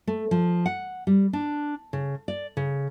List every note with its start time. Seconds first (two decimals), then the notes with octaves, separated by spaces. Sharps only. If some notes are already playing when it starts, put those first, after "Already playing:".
0.07 A3
0.31 F3
0.66 F#5
1.07 G3
1.33 D4
1.93 C#3
2.28 D5
2.57 C#3